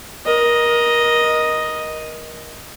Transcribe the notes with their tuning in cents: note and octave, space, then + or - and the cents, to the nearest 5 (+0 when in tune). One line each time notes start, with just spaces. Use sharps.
A#4 +30 D#5 +0